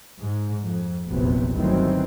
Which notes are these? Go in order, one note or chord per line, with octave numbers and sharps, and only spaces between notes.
G#2
F2
F1 A#1 E2 C3 F#3 B3
G1 D2 D#3 E3 F#3 C4